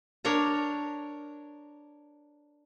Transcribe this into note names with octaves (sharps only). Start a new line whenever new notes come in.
D4 A#4 C#5 A#5